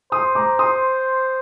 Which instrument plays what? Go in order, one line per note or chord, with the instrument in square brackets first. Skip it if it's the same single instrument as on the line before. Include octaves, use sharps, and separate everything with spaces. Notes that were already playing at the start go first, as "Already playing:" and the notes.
[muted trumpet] C5 [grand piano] C6 D#6
[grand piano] A#5 D6
C6 D#6